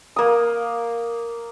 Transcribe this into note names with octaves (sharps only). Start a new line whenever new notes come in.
A#3 D#6